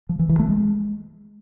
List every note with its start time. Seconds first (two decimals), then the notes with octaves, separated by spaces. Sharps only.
0.09 F3
0.19 E3
0.29 E3
0.39 A3
0.49 G#3